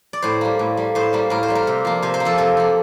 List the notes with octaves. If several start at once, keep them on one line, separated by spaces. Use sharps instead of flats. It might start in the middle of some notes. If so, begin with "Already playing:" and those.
D5
A2 C5
G3 A#3
A2
G3 A#3
A2 C5
G3 A#3
A2 A#4
C5
G3 A#3
A#4
C3
F3 A#3
C3 C5
C5
A#3
F3 A4
C3 A4
F3 A#3